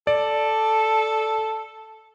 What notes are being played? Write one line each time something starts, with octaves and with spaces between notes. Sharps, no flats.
A4 D5